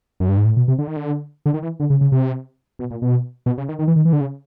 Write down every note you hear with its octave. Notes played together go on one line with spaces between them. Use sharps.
F#2
G2
G#2
A2
B2
C3
D3
D#3
D3
D3
D#3
E3
D3
C#3
C#3
C3
B2
A#2
B2
B2
C#3
D#3
D#3
E3
D#3
E3
D3
C#3